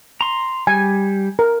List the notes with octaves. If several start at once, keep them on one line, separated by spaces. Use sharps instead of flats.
A#5 C6
G3 G#5
A#4